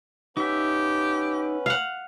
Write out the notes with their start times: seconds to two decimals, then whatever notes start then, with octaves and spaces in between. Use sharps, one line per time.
0.37 B3 C#4 D#4 G4 B4 E5
1.66 F5 F#5